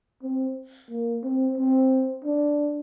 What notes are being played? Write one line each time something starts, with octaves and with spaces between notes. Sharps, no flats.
C4
A#3
C4
C4
D4